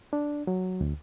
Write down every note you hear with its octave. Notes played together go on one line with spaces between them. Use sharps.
D4
F#3
D2